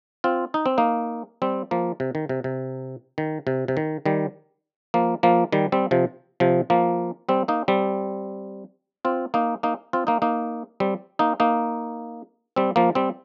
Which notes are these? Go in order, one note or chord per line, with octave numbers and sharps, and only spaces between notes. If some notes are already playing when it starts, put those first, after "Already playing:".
C4 F4
D#4
C4
A#3 D#4
G3 C4
F3 A#3
C3
D#3
C3
C3
D#3
C3
C3
D#3
D#3 G3
F3 A#3
F3 A#3
D#3 G3
G3 C4
C3 F3
C3 F3
F3 A#3
G3 C4
A#3 D#4
G3 C4
C4 F4
A#3 D#4
A#3 D#4
C4 F4
A#3 D#4
A#3 D#4
G3 C4
A#3 D#4
A#3 D#4
G3 C4
F3 A#3
G3 C4